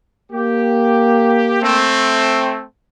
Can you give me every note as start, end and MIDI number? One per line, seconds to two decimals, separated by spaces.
0.32 1.89 58
0.32 1.60 67
1.62 2.63 57
1.62 2.63 60